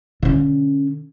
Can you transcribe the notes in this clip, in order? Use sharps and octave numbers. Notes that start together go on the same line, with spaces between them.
D3 C#4